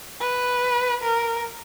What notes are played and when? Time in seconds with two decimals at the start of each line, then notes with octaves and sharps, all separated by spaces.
0.21 B4
1.03 A#4